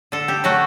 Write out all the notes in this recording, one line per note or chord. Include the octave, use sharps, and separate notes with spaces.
D3 A4
G4
F#3 A3 F#4